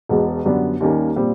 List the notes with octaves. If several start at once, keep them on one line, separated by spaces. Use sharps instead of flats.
E1 E2 B2 G#3
F#2 D3 G3 B3 D4
D#2 D#3 G3 A#3 C#4
A#2 G3 C4 F4